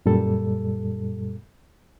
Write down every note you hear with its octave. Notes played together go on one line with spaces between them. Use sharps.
F#2 A#2 G3 A4